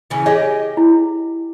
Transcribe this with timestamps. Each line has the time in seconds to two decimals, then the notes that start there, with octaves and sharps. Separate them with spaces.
0.10 C#3 E3 C#4
0.26 G4 G#4 C#5 D#5
0.77 E4